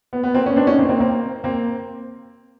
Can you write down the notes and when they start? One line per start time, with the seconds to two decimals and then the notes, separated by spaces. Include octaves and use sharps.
0.13 B3
0.23 B3
0.34 A#3 C4
0.46 B3 C#4
0.56 C4 D4
0.67 C#4 D#4
0.79 A#3 C4
0.89 A#3 C4
1.00 A#3 C4
1.44 A#3 C4